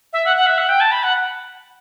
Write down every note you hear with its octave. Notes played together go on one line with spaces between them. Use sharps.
E5
F#5
F#5
E5
F#5
G5
A5
B5
F#5